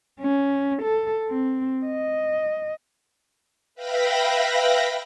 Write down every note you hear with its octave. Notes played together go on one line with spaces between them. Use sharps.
C#4
A4
C4
D#5
B4 E5 F5 G5 B5 A#6